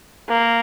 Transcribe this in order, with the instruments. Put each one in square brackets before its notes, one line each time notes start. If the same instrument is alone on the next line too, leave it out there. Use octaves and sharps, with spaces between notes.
[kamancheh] A#3